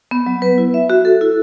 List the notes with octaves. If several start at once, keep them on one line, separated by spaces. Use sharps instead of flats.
B3
F#3
B4
E4
E5
F#4
A4
E4